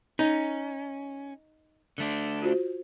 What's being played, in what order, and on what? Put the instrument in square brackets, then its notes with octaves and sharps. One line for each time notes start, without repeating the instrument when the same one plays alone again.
[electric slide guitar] C#4 [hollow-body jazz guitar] D#4
[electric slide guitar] D3 A3 D4
[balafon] F4 F#4 C5